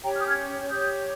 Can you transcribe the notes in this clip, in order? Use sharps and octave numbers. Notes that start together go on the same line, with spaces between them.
C#4 G4 C#5 G5 A#5
F6
D#6 G6
F6 G#6
G4 C#5 D#6 G6